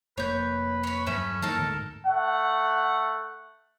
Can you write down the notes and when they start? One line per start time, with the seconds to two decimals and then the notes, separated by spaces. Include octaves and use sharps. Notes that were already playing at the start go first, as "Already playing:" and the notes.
0.18 F1 A#3 B4 C#5 G6
0.83 C#5 B5
1.06 E2 G2 F#3 A3 C#4 E5 B5
1.42 D#3 E3 A#3 D#4 A4 A#4 A5
1.58 D2 G#2
2.07 A3 F#5